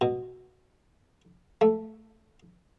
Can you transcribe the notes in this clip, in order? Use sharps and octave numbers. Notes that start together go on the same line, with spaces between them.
B2
A3